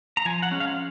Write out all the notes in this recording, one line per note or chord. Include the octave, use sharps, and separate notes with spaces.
A#5
F3 G#5
F#5
G#3 C#4
F5